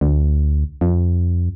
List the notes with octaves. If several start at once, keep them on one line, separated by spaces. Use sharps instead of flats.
D2
F2